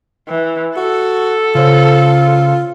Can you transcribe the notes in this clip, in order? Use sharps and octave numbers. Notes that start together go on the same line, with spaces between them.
E3
F#4 A4
C#3 F4 C5 C#5